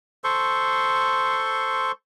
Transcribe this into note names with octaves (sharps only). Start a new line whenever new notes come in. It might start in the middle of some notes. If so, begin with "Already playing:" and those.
A4 C5 C6 C#6